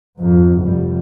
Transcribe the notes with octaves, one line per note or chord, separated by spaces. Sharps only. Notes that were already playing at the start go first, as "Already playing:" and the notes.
F2 G#2
F1 G3